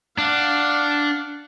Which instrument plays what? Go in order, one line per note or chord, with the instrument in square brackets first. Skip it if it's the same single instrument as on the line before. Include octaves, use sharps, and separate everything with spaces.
[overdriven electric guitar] D4 [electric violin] F5 F#5